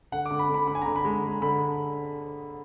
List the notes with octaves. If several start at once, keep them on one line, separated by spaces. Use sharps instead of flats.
D3 F#5
D6
D3
B5
D3
B5
D3 B5
G#5
D3 A#5
B5
G#3
G#3
D3 B5